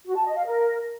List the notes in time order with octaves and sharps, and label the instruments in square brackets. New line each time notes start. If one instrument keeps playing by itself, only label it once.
[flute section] F#4
A5
D#5
F5
A#4